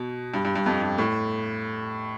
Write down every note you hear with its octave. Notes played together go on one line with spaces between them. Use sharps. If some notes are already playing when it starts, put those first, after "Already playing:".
Already playing: B2
G2
G2
G2
F2
G2
A2